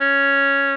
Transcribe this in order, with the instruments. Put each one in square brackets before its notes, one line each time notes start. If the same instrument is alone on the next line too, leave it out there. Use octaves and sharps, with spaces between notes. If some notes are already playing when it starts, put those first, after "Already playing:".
[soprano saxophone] C#4